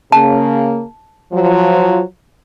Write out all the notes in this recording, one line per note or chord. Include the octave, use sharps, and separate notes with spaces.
C#3 A#3 A5
F3 F#3